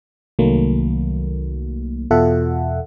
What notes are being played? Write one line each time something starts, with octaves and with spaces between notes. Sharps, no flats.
C2 D#3 F#3 A3 A#3
E2 B2 F4 A4 E5 F#5